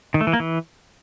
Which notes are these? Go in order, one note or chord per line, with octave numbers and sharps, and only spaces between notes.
D#3
A3
E3
A#3
E3